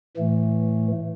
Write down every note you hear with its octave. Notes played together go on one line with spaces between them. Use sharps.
A2 E3 A3